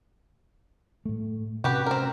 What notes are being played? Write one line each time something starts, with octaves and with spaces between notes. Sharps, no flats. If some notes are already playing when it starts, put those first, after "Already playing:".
A2 A3
C3 C#4 F#4 G4 B4
C4 A#4